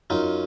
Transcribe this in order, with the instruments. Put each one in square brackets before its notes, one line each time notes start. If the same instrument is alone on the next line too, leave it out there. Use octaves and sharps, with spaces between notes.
[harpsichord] F#2 D#4 F4